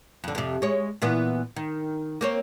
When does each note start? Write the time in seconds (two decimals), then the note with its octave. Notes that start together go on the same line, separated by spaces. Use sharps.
0.24 F2 D3
0.35 F2 C3
0.62 G#3 C#5
1.02 A#2 E3 B3
1.56 D#3
2.21 A#3 C4 C#5